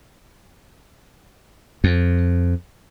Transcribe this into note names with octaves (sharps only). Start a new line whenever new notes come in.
F2